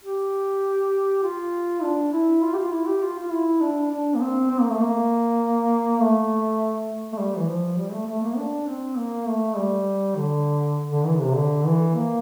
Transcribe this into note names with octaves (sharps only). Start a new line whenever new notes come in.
G4
F4
D4
E4
F4
G4
F4
E4
G4
F4
F4
E4
D4
D4
A#3
C4
C4
A#3
A3
A#3
A3
A3
G3
E3
F3
G3
A3
A3
A#3
D4
C4
A#3
A3
G3
D3
D3
E3
C3
D3
E3
A#3